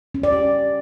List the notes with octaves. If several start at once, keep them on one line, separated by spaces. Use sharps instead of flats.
C#4
D5
G4